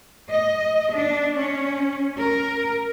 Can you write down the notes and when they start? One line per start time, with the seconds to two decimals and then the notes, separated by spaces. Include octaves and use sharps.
0.30 D#5
0.92 D4
1.37 C#4
2.20 A#4